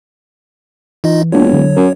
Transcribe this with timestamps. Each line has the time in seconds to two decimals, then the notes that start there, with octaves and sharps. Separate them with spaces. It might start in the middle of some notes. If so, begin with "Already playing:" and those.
1.04 E3 D#4 F4 D#5
1.32 E1 A#3 D4 F4 C#5
1.51 D3 F#3
1.76 F#2 A#4